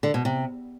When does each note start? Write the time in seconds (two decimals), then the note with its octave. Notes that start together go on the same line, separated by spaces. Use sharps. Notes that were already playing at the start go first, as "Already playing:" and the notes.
0.03 D3
0.14 B2
0.25 C3